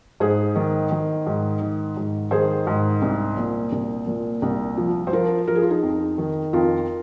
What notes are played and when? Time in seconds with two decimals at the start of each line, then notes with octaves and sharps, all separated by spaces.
0.20 G#2 G#4 C5
0.56 D#3
0.91 D#3
1.27 G#2
1.61 D#3
1.97 G#2
2.31 D#3 G#4 C5
2.67 G#2
3.02 C2
3.37 A#2
3.72 C2
4.07 A#2
4.42 C2
4.77 F3
5.07 C5
5.13 F3 F4 A#4
5.47 F3 A#4
5.55 G#4
5.62 F4
5.70 D#4 G#4
5.83 F2
6.18 D#3
6.53 F2 F4 A#4